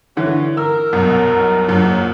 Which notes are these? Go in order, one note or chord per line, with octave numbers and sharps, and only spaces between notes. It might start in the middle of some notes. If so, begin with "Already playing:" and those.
D3 E3 A3 C#4 F#4
A#4 E6
C2 F#2 B2
F#1 F#2 A#2